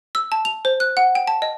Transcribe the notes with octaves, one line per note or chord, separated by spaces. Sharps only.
E6
A5
F7
C5
F#6
F#5
G5
A5
D#5